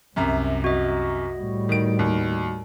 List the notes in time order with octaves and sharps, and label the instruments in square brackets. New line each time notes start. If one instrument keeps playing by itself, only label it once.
[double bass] C2 [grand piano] F#2 C3 A#5
[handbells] F#4 D#5
[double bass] A2 G3
[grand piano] D#3 D7
D#2